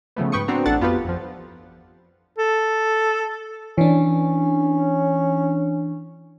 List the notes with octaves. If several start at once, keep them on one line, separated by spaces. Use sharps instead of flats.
C#3 F3 A3 B3
G#2 B4 G5 C#6 D#6 C#7
B3 C4 D4 F#4 C5 A#5
A1 D4 A4 F#5 A6
F2 B3 F4 G4 B4
F2 F3
A4
E3 C#4 D4